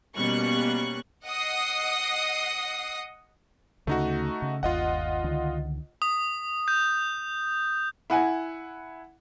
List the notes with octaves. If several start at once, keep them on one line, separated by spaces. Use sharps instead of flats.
B2 G3 A#3 C#4 C#6 F#6
D#5 F#5 D#6 A#6 C7
D2 C#3 A3 D#4 F#4
C#3
G1 D#2 F4 D#5 F#5
C#2 D3 D#3
D#6
G6
E4 F#5 G#5